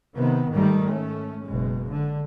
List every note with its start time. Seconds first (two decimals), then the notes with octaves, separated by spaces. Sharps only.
0.15 C3 D#3 B3
0.52 G#2 D#3 G3 A3
0.87 A3 C#4
1.46 F#1 B2 G#3
1.92 D3